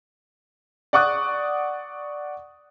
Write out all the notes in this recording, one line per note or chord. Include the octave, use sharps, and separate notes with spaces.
D5 F#5 C#6 D#6 F#6